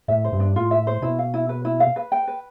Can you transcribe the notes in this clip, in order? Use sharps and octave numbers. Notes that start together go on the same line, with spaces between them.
A2 E5
C5
G2
D4
A2 F4
E5
C5
B2 E4
F5
E4
B4
E4
F5
B4
G5
B4